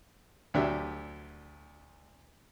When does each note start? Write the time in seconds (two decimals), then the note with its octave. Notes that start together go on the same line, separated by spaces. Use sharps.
0.54 D2 F#3 D4 G4 E5